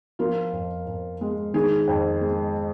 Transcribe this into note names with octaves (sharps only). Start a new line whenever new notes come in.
F3 F4 A#4
F2
F2
G#3
D#3 G#4
F2
G#3